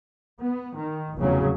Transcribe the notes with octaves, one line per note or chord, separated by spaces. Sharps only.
B3
D#3
F1 E2 C#3 F#3